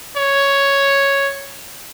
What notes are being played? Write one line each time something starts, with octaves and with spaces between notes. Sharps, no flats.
C#5